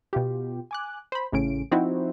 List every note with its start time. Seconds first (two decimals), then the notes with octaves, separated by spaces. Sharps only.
0.13 B2 F4 G4
0.71 G#5 D6 F#6
1.12 C5 B5
1.32 A1 A2 C#3 C#4 D7
1.71 F3 C4 D#4 E4 F#4